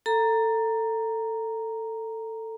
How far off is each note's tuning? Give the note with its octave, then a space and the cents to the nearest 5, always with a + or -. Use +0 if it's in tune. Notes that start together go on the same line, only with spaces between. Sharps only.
A4 +15 A#5 +0